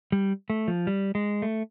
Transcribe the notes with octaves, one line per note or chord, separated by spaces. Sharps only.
G3
A3
F3
G3
G#3
A3